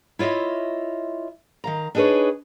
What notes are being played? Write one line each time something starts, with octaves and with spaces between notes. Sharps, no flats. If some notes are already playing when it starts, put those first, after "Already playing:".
E4 F4 C#5 D#5 E5
D#3 F5 A#5
D4 D#4 G#4 A#4 B4 C#5